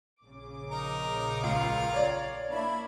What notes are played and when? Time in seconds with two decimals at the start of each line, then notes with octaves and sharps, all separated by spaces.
0.23 A#1 C#3 D6
0.71 D#4 A#4
1.43 C#2 F4 A#4 F5
1.94 C#5 D5
2.51 A#3 D4 E4 B5